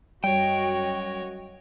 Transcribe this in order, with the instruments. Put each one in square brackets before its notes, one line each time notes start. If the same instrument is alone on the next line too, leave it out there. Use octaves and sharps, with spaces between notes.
[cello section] F#2 F#4 D#5 [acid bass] G3 [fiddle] C#5 [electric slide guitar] G5